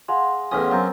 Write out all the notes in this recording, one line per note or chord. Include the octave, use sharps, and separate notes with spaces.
G#3 F5 F#5 C6
E2 A2 C#4 D#5 D#6
F#2 B3 C4 A#5